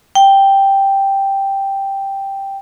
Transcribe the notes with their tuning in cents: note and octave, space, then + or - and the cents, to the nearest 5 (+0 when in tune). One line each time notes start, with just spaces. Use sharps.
G5 +0